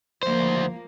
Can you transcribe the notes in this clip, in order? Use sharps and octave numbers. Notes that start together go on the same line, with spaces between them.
D2 F3 A#3 C5